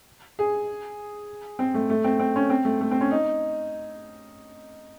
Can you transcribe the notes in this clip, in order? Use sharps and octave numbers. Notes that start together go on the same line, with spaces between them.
G#4
C4
A3
A3
C4
C4
C#4
C4
A3
A3
C4
C#4
D#4